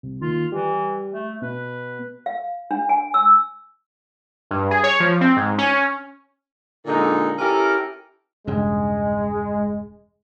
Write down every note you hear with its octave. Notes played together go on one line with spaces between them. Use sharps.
C2
D#2 F4
E3 G3
A3
B2 B4
F5
D4
G#5
E6
G2
G#4
C#5
F3
C4
G#2
C#4
A#2 D3 G#3 D#4
C#4 E4 G4 A4 A#4
E1 G2 C#3 G#3